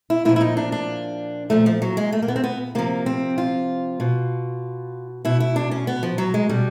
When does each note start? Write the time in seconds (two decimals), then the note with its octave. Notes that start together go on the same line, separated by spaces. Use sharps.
0.10 E4
0.25 A#2 E4
0.29 F3
0.36 E4
0.41 D#4
0.57 D4
0.72 D4
1.50 A#2 F3 A3
1.66 F3
1.82 F#3
1.97 G#3
2.13 A3
2.23 A#3
2.28 B3
2.36 C4
2.44 B3
2.75 C3 F3 A#3
3.06 C4
3.38 F4
4.00 B2
5.25 B2 E4
5.40 E4
5.56 D4
5.71 C#4
5.87 B3
6.03 F3
6.18 F#3
6.34 G#3
6.49 B2 G3